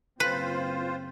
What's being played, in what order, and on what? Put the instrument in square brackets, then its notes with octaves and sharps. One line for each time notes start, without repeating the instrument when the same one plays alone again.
[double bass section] F#1 C4 [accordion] F4 C5 [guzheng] B4